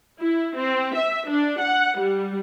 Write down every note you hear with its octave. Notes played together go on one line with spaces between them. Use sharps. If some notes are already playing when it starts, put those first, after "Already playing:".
E4
C4
E5
D4
F#5
G3